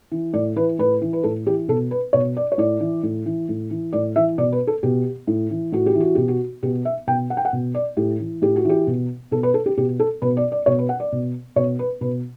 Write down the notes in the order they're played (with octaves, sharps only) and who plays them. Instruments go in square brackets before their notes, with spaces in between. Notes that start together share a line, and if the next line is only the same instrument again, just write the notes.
[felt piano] E3
A2 D5
E3 B4
A2 B4
E3
B4
A2 A4
E3 G4
B2 A4
B4
B2 C#5
D5
C#5
A2 D5
E3
A2
E3
A2
E3
A2 D5
E3 E5
B2 D5
B4
A4
B2 G4
A2
E3
A2 F#4
G4
E3
F#4
B2 G4
F#4
B2 G4
E5
B2 G5
F#5
G5
F#5
B2
D5
A2 G4
E3
A2 G4
F#4
E3 G4
B2
B2 A4
B4
A4
G4
B2 G4
A4
B2 B4
D5
D5
B2 C#5
B4
F#5
D5
B2
B2 C#5
B4
B2 B4